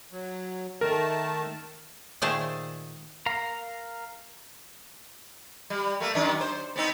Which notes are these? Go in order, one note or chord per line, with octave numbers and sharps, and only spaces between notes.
F#3
D#3 A3 A#4 A5
A#2 D#3 A3 G#4 C5 A5
A#4 F5 A#5
G3
A3 A#3
F#2 D#3 D4
C5
B3 C4 D#4